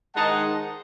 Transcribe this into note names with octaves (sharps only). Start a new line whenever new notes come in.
G#2 D#3 G#3 D#4 F#5 A5